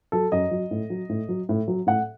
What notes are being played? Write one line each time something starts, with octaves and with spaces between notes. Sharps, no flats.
F#3 A4
F#2 D#5
F#3
A2
F#3
A2
F#3
A2
F#3
A2 F#5